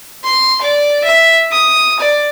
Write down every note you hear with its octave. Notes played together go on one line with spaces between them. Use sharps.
C6
D5
E5
D#6
D5